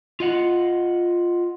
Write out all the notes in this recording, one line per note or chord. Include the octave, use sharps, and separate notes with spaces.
F4 D#5 F#5